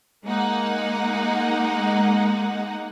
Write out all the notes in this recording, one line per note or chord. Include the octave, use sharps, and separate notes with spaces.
G#3 A#3 D#4 F#5